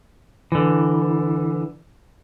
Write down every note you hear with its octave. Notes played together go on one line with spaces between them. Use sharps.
D3 E3